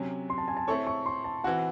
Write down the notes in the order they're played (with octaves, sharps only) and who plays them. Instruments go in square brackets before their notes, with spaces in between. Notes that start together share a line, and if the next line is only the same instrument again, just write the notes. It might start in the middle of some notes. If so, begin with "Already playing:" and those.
Already playing: [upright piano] C3 F#3 C#4
[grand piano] C6
A5
G#5
A5
[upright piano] A3 C4 E4 A4 C#5 [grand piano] C#6
[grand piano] C#6
C6
A5
[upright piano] E3 C4 F#4 [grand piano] F#5